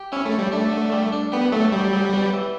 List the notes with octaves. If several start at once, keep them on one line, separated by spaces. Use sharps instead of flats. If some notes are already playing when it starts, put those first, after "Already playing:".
Already playing: G4
C#4 E4
A3
C#5
G3
A3 D4
D3
G3
D4
B3 G4
F#3 A3
F#3 G3
F#3
B3
E3